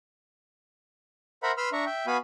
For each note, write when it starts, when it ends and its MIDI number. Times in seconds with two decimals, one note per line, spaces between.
1.43 1.52 70
1.43 1.52 72
1.43 1.52 76
1.43 1.52 78
1.43 1.52 82
1.43 1.52 83
1.57 1.69 71
1.57 1.69 83
1.57 1.69 84
1.57 1.69 88
1.57 1.69 89
1.73 1.85 62
1.73 1.85 76
1.73 1.85 82
1.73 1.85 85
1.86 2.06 76
1.86 2.06 79
2.07 2.17 59
2.07 2.17 66
2.07 2.17 77
2.07 2.17 80
2.07 2.17 83